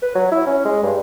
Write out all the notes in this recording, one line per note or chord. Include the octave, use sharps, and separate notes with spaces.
B4
F#3
E4
C#4
G#3
G2